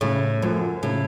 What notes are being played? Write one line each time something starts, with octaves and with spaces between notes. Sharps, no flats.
A2 C#3
F#2 F3 A3
A2 C#3